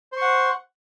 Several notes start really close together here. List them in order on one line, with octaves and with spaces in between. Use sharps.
C5 C#6 F#5